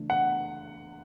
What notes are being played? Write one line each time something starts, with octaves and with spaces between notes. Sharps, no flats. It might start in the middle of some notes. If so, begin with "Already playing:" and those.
Already playing: C#3 E3 A3 D4
F#5